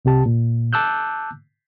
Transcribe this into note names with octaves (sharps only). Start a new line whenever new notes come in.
C2 C3 G4 A5
A#2
A5 D6 E6 F#6 G6